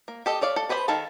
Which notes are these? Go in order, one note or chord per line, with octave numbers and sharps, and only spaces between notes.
A#3
G4 A4 D#5
A4 C#5 D5 F5
A4
G#4 B4 C5 D5 B5
D#3 G#4 A4 F5 A5